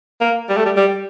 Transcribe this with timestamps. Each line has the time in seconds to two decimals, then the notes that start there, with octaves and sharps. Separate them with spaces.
0.21 A#3
0.49 G3
0.57 A3
0.66 G3
0.76 G3